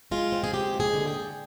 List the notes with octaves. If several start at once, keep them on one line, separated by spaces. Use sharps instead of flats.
G#3 F4
C4
G#4
G#3 G4
D#2
G#4
D3
G5
D3